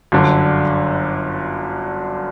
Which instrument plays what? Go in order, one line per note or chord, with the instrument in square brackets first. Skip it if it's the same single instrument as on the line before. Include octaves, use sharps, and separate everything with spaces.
[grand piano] G1 F#2 D3